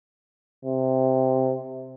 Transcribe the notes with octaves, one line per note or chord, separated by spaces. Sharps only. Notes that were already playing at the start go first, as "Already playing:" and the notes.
C3